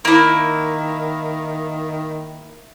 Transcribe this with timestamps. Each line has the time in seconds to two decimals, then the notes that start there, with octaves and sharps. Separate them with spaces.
0.05 D#3 A#3 E4